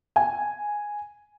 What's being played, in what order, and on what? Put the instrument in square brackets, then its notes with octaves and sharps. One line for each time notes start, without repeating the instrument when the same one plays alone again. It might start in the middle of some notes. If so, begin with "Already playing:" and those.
[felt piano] G#5